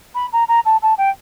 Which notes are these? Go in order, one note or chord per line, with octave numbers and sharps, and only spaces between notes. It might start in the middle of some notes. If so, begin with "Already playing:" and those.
B5
A#5
A#5
A5
A5
G5